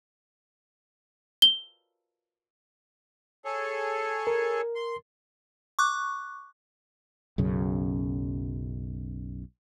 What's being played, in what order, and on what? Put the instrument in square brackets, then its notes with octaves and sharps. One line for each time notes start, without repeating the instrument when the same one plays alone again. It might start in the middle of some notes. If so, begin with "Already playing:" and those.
[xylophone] G7
[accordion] G#4 A4 C#5
[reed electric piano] A#4
[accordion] C6
[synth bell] C#6 D6 F#6
[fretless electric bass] B1 F#2 C#3